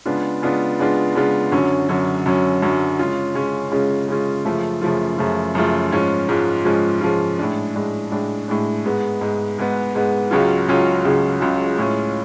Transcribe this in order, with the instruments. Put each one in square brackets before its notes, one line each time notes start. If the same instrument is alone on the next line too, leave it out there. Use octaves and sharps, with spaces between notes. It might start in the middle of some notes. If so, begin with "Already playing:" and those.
[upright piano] C#3 G#3 B3 D4 F4
C#3 G#3 B3 D4 F4
C#3 G#3 B3 D4 F4
C#3 G#3 B3 D4 F4
F#2 D3 F#3 C#4
F#2 D3 F#3 C#4
F#2 D3 F#3 C#4
F#2 D3 F#3 C#4
C#3 G#3 C#4 F4
C#3 G#3 C#4 F4
C#3 G#3 C#4 F4
C#3 G#3 C#4 F4
F#2 C#3 F3 A3 F4
F#2 C#3 F3 A3 F4
F#2 C#3 F3 A3 F4
F#2 C#3 F3 A3 F4
G#2 F3 G#3 C#4 F4
G#2 F3 G#3 C#4 F4
G#2 F3 G#3 C#4 F4
G#2 F3 G#3 C#4 F4
A2 G#3 D4
A2 G#3 D4
A2 G#3 D4
A2 G#3 D4
G#2 G#3 B3
G#2 G#3 B3
G#2 G#3 B3
G#2 G#3 B3
C#2 C#3 F#3 C#4 F4
C#2 C#3 F#3 C#4 F4
C#2 C#3 F#3 C#4 F4
C#2 C#3 F#3 C#4 F4
A2 G#3 C#4 F4